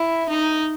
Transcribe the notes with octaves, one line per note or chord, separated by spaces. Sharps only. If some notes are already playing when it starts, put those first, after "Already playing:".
Already playing: E4
D#4